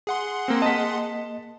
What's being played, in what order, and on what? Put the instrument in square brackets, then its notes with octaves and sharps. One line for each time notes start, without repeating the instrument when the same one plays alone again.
[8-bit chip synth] G#4 F#5 C6
[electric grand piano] A#3 C4
[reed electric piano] A#3 D#5 [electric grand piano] A5 B6